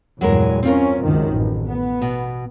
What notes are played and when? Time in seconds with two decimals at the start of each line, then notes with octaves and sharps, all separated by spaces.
0.21 E2 G2 A#2 F#3 G#3 A#4
0.63 C4 C#4 F4 A#4
1.01 C#2 F#2 D#3
1.33 A1
1.66 B3
2.01 B2